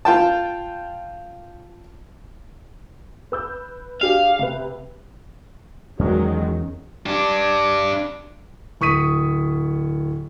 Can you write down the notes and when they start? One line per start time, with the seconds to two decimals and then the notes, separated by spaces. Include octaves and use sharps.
0.05 F4 G5 A5
3.32 B4 E6 G6
4.02 D4 G4 G#4 F5
4.39 C3 B4
5.99 E2 D#3 F#3 G#3 C#4
7.06 D4 G4
8.81 D1 C#6 D#6 B6 D#7